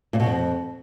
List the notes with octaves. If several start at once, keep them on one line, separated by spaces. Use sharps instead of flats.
A#2
B2
F2